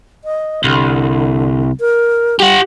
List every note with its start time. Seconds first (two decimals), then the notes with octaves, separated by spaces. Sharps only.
0.24 D#5
0.64 C2 D3
1.80 A#4
2.40 G3 G4 F#5